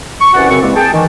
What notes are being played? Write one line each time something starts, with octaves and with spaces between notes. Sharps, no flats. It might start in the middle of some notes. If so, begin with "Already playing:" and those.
C#6
C2 E3 C#4 F#4 D5 F#5
F#2 C#3 C4 C#6
E3 G3 G#3 A#3 C4
G#4 G5 A5
D#3 E3